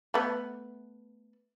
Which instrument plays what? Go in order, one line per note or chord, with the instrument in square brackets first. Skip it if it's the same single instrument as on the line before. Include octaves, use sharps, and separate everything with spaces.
[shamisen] A3 B3